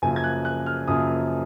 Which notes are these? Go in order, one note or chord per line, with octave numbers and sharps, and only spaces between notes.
F#2 C#3 F3 A#3 G#5
G#6
F#6
F#6
F6
F#2 C#3 F3 A#3 D#6